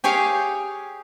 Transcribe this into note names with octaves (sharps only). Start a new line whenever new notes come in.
G4 G#4 C#5 F5 G5